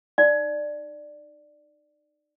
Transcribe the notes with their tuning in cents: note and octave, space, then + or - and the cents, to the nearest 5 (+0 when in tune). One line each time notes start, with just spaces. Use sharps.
D#4 -30 D5 +10